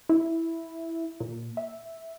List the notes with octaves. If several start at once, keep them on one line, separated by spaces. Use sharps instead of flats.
E4
A#2
E5